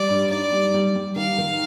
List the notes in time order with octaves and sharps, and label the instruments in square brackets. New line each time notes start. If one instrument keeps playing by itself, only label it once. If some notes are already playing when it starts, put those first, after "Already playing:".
Already playing: [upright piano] G3 [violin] D5
[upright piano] G2
[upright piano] D#4 [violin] D5
[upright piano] G3
G3
G3
[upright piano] D#3 [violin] F5
[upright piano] D#3